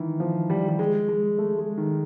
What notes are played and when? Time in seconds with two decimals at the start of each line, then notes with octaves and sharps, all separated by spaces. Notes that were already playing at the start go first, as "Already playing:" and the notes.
Already playing: D#3 E3
0.20 F3
0.50 G3
0.68 G3
0.79 G#3
1.09 G#3
1.38 A3
1.59 G#3
1.77 D#3